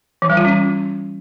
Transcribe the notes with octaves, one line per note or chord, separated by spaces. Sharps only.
E3
G3
F4
C#4